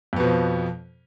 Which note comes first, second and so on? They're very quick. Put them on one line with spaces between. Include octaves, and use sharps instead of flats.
F2 B3 B2 F3